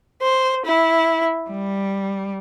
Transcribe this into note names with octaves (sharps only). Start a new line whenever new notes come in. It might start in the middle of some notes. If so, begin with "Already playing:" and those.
C5
E4
G3